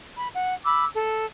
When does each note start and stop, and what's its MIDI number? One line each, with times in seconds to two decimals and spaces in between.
0.17 0.28 83
0.34 0.54 78
0.65 0.85 83
0.65 0.85 86
0.65 0.85 88
0.94 1.25 69